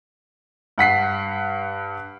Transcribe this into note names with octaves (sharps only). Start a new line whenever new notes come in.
G2 F#5 B6 C7